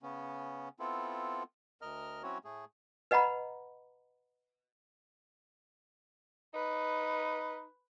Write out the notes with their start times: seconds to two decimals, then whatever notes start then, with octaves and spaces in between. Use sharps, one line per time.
0.02 C#3 B3 C#4
0.80 B3 C4 E4 F4 A4
1.82 D2 A#4 D#5 F6
2.23 F#3 C4 C#4 E4 F#4 C#5
2.44 A2 A3 G#4
3.11 B4 D#5 F#5 A#5 B5
6.54 D#4 B4